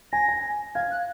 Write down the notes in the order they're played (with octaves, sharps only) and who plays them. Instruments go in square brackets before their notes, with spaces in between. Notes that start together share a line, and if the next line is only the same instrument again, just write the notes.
[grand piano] G#5 [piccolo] A#6
[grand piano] G#5
[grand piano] F5 [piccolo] G#6
[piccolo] F#6